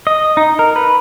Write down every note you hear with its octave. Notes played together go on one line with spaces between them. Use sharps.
D#5
D#4
A#4
B4